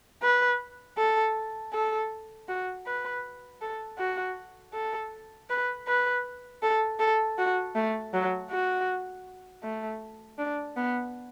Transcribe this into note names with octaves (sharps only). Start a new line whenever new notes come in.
B4
A4
A4
F#4
B4
A4
F#4
A4
B4
B4
A4
A4
F#4
A3
F#3
F#4
A3
D4
B3